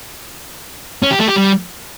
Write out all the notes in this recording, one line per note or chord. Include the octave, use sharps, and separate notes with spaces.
C#4
G4
A3
G4
G3